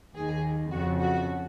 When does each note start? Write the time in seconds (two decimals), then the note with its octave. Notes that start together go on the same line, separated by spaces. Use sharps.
0.15 D#2 D#3 G#4
0.71 F2 C#3 F#4
1.00 F#4